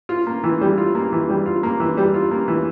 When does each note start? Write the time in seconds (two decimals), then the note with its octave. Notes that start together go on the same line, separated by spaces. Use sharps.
0.09 F4
0.27 A#3
0.44 E3
0.61 G3
0.78 F4
0.95 A#3
1.12 E3
1.30 G3
1.46 F4
1.63 A#3
1.80 E3
1.97 G3
2.14 F4
2.31 A#3
2.48 E3